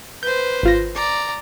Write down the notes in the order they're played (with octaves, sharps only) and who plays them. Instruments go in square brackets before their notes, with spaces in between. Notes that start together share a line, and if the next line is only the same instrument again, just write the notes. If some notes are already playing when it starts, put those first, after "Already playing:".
[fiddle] B4 C5 [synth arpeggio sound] G6
[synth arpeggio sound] G#1 F4 A#6
[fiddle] D5 A#5